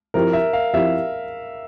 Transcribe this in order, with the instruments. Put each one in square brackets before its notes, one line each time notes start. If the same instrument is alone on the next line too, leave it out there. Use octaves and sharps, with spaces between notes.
[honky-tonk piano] F3 C4 E4 G4 [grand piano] A#4
[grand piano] E5
F5
[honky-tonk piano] F3 C4 E4 G4 [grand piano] E5